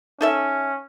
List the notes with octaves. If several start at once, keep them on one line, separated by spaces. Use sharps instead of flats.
C#4 D#4 A4 E5